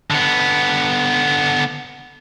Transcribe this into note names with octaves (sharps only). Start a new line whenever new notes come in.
D3 B3